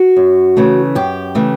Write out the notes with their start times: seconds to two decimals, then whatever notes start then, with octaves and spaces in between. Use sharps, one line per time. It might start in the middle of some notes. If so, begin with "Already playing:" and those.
Already playing: F#4
0.17 F#2
0.57 C#3 E3 A3
0.95 F#2 G4
1.35 C#3 E3 A3